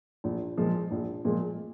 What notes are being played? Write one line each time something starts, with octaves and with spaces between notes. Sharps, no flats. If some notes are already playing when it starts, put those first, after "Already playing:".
A#1
A#2 F3 G#3
A#1
A#2 F3 G#3